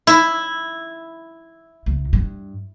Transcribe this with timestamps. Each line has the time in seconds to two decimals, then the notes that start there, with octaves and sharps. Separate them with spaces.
0.07 E4
1.86 C#2
2.13 G2